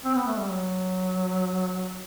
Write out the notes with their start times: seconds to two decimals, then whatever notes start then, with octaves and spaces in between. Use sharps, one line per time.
0.05 C4
0.16 B3
0.27 A3
0.39 G3
0.50 F#3